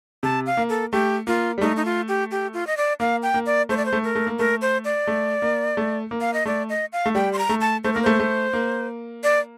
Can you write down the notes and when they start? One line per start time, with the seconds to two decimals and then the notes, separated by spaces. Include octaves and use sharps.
0.23 C3 A5
0.46 F5
0.57 A#3
0.69 A4
0.92 A3 G4
1.27 A#3 F4
1.58 G3
1.61 A3 D#4
1.76 D#4
1.85 F4
2.08 G4
2.31 G4
2.54 F4
2.67 D#5
2.77 D5
3.00 A#3 F5
3.23 G5
3.34 A#3
3.46 D5
3.69 A3 C5
3.77 D5
3.85 C5
3.93 A3
4.04 A#4
4.15 A3
4.27 A#3
4.39 A3 A#4
4.61 C5
4.85 D5
5.07 A3
5.42 A#3
5.77 A3
6.11 A#3
6.21 F5
6.34 D#5
6.45 A3 D5
6.69 D#5
6.92 F5
7.06 A3
7.15 G3 G5
7.33 C6
7.38 A#5
7.49 A3
7.61 A5
7.84 A3 C5
7.93 A#3 A#4
8.03 A3 C5
8.20 A3
8.53 A#3
9.23 D5